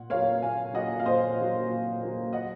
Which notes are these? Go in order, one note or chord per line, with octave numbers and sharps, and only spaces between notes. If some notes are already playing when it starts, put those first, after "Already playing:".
Already playing: A#2 F#5
F#3 A#3 C#5 F5
A#2 F5 G#5
F#3 A#3 D#5 F#5
F5
A#2 C5 D#5
F#3 A#3
A#2
F#3 A#3
D#5 F#5